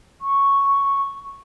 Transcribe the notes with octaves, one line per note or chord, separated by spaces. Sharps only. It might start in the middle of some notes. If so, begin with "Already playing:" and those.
C#6